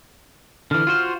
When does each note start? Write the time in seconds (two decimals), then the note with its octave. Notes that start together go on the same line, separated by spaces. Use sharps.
0.71 D3 E3 F6
0.87 F4 F#4 C5